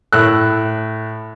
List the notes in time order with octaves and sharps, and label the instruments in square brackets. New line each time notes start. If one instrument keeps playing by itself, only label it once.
[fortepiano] A2 E6 F#6